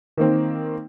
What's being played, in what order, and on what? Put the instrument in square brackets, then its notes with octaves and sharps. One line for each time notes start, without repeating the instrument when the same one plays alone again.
[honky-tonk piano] D#3 A#3 C4